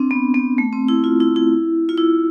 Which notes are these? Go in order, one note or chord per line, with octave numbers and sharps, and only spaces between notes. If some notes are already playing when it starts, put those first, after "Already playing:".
Already playing: C4 D4
B3
B3
A3
C4
E4
F4
E4
E4
F4
E4